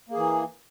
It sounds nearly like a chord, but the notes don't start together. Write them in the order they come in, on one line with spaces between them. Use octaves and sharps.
A#3 G#4 E3